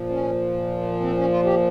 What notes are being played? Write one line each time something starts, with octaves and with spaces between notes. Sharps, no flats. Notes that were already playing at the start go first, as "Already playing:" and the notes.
Already playing: A#2 F3
C#4
C4
C#4
F4
G4